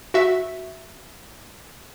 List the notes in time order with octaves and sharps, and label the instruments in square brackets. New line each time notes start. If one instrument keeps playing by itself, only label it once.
[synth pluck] F#4 E5